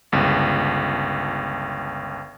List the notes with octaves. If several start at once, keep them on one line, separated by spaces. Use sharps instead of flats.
G1 C#2